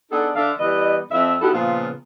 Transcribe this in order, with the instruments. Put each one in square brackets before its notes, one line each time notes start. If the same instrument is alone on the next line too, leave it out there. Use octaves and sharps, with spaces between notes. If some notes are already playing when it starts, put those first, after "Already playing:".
[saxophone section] B3 D4 D#4 G#4 A4
D3 E5 F5
E3 G3 B3 D#5
F2 E5
B3 D#4 E4 F#4 G4 A4
A#2 C#3 F3 B3 F4